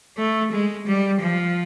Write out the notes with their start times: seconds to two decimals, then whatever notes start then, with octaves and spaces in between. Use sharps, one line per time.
0.17 A3
0.52 G#3
0.86 G3
1.21 F3